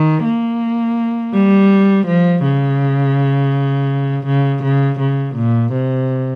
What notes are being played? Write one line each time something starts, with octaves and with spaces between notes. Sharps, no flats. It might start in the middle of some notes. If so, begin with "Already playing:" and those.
Already playing: D#3
A#3
G3
F3
C#3
C#3
C#3
C#3
A#2
C3